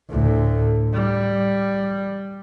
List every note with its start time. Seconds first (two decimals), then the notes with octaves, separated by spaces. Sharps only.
0.10 D2 A2
0.93 G3